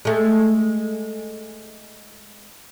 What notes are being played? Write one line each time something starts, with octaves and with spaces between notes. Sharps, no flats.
G#3 A3